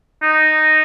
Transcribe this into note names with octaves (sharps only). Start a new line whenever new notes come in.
D#4